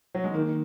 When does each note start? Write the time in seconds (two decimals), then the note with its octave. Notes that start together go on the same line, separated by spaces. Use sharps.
0.15 F#3
0.24 G#3
0.33 D#3 A#3